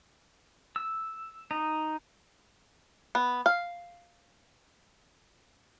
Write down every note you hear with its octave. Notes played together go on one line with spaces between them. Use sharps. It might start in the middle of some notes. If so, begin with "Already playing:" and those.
E6
D#4
B3
F5